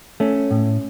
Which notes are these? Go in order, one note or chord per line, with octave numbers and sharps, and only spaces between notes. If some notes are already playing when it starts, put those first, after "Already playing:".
A3 C#4
A2